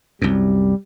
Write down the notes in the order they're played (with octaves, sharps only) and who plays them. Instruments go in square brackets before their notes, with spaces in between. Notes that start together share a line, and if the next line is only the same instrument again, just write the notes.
[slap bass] C2 F#2 [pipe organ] G3